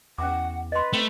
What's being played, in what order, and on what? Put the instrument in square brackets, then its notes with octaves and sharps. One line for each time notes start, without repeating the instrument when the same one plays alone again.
[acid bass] E2 [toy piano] C#4 D6 [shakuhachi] F#5
[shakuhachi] B4 [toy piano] D#5 C6
[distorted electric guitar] A3 [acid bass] C4